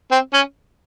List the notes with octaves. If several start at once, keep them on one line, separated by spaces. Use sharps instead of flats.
C4
C#4